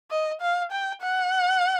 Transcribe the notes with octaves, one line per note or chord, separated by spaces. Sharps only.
D#5
F5
G5
F#5